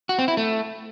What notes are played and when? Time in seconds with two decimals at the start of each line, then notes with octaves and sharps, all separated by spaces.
0.09 F#4
0.19 C4
0.28 E4
0.37 A3